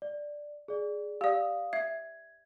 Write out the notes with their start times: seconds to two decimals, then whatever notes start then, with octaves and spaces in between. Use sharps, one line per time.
0.02 D5
0.68 G#4 D5
1.21 G4 D5 F5 D#6
1.73 E5 G#6